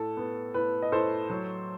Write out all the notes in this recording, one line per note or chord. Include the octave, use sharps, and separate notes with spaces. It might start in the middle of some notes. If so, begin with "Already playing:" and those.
Already playing: A2 A4
B3
A2 B4
D#5
A2 A4 C5
F#3